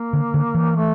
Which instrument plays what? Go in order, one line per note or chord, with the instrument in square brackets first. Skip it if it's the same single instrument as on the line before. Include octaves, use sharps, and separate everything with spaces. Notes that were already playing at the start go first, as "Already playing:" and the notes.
Already playing: [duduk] A#3
[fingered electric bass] D3
D3
E3
[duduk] A3